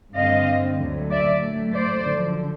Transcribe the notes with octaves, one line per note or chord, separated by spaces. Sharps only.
G2 D3 G3 C4 D#5 F5
D2 D3 F#3 A3
D5 E5
A2 F#3 A3
C5 D5
F#2 D3 F3